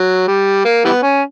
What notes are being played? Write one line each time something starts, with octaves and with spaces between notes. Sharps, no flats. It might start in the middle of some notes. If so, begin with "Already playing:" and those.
Already playing: F#3
G3
A#3
E3 G3 B3
C#4